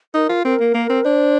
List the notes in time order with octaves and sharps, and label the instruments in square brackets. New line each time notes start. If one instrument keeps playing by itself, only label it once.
[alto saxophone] D#4 [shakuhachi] A#4
[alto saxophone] F4
[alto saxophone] C4 [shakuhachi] A#4
[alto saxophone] A#3
A#3
C4
[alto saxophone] D4 [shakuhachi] C5